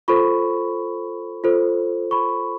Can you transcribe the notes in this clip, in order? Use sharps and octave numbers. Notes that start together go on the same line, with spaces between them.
F4 A4 C5 B5 C#6
F4 A4 C5
B5 C#6